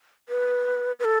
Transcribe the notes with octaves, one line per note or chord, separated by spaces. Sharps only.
B4
B4
A4